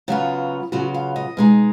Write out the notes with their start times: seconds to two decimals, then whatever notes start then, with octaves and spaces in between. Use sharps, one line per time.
0.08 C#3 F#3 B3 F4 F#4
0.72 C#3 F#3 B3 F4 F#4
0.94 F5
1.16 D#5
1.37 B2 G#3 D#4